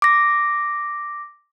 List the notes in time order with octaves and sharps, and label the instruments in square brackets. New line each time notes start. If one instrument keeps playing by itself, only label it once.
[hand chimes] D6 A#6